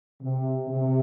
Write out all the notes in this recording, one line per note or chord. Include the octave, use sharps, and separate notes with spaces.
C3
C3